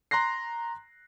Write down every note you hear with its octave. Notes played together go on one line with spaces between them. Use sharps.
A#5 C6 F#6 A#6 C7